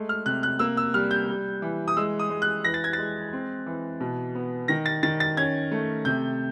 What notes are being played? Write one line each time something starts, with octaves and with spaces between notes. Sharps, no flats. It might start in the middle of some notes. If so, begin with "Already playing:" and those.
Already playing: G#3 A3
F6
C3 F#6
F#6
A#3 E6
E6
G3 F6
G6
G3
E3
D#6
G#3 E6
D#6
G#3
F#6
E3 A#6
A6
G#6
A6
G#3
C4
E3
B2
B3
D#3 A#6
A6
D#3 A6
A6
C#4 G#6
A3
C3 G6